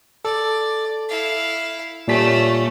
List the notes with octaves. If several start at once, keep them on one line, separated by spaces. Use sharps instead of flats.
A4 D5
E4 F5
A#2 G3 A3 C#4 B6